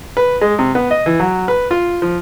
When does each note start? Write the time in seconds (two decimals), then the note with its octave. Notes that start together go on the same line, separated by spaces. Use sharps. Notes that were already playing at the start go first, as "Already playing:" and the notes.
0.17 B4
0.41 G#3
0.59 C3
0.75 B3
0.91 D#5
1.06 E3
1.20 F#3
1.48 B4
1.71 F4
2.02 F3